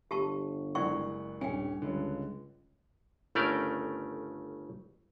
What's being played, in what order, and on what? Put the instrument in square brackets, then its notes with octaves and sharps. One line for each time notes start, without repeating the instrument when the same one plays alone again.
[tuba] G1 [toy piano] G4 A5 C#6
[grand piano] F#1 G#3 F#5 [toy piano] E4 D5 C#6
[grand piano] D#1 C#4 [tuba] G2 [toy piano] G5 G#5
[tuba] C#2 [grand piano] G2 D3
[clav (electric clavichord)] G1 C#3 A3 C#4 A#4 D5